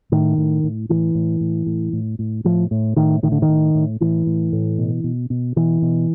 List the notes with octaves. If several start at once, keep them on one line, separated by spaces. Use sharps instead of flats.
A2 D#3
A2
A2
A2 E3
A2
A2
A2
A2
A2
A2 F3
A2
A2 D#3
A2 D#3
D3
D#3
A2
A2
A2 E3
A2
A2
B2
B2
B2
B2 E3
B2